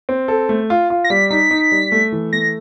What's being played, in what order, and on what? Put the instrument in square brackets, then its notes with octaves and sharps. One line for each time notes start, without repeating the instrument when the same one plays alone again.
[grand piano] C4
A4
A3
F4
F4
[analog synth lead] A#6
[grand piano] G3 [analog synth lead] B6
[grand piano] D#4 [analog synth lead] B6
[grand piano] D#4
G3
A3
E3
[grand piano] A3 [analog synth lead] A#6